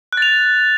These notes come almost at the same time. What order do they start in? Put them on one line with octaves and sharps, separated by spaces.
F#6 A6 F7